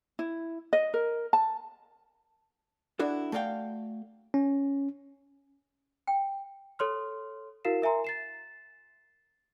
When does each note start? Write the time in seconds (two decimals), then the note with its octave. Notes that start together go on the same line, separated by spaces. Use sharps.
0.19 E4
0.73 D#5
0.94 A#4
1.33 A5
2.99 D4 E4 F#4 A4
3.32 A3 F#4 D5 F5 G5
4.34 C#4
6.07 G5
6.79 A4 C#5 C6 F6
7.65 E4 F#4 A#4 F5 C7 E7
7.82 A#4 E5 G#5 A#5 C6
8.04 A6 C7 E7